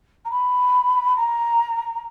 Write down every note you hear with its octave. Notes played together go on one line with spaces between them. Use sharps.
A#5
B5
A#5